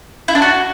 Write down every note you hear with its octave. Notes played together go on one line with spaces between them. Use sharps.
E4
D4
F#4